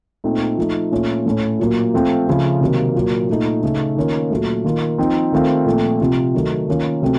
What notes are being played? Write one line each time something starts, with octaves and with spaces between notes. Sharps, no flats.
A#2 A3 C4 D#4
F3 A3 D#4
A#2 A3 C#4 F4
A2 A3 C#4
A#2 F#3 A#3
F3 A3 C4 F4
C#3 F3 A3
C3 D#3 F#3 A#3
A#2 F#3 A#3
A#2 A3 D#4
C#3 A3 D#4
D#3 A#3 C#4 F4
A#2 F#3 A3
D#3 A#3 F4
F3 C4 D#4
D#3 A3 C4 F4
A#2 F3 A3 C4
C3 F3 C4
D#3 F#3 A3
D#3 A#3 C#4 F4
C3 F#3 A3 C4